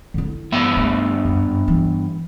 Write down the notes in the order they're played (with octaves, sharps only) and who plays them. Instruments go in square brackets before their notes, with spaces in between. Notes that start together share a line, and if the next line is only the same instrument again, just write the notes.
[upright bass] D3 E4
[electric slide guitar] G2 B3 E5
[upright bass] A3
F#2
E3